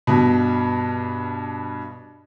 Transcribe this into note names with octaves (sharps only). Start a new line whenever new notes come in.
G2 B2